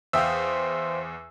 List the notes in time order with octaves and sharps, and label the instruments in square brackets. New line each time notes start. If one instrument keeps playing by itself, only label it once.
[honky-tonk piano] E2 E5 D#6 [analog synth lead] C5 [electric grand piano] F5 G5 E6